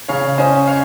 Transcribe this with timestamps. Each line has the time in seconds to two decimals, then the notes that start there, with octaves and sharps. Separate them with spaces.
0.09 C#3 C#5 F5
0.38 C#4 C5 D#5
0.67 C#5 F5